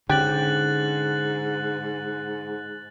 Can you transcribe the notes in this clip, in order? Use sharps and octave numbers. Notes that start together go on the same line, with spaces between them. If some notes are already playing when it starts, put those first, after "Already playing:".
G#2 D3 C#4 G4 F#6 A6 F#7